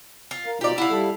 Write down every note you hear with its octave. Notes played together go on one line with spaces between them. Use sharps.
F4
A#4 F5
B2 D#4 F4 G4 D5
E4 F5 F#5
G3 A4